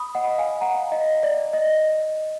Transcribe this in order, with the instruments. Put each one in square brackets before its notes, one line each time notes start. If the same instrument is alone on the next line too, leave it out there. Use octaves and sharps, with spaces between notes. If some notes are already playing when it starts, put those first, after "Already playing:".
Already playing: [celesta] B5 D#6
D#5 F#5
F5 G#5
F#5 A#5
D#5
D5
D#5